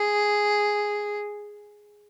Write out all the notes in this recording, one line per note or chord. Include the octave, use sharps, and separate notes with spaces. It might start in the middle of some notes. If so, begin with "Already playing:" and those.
Already playing: G#4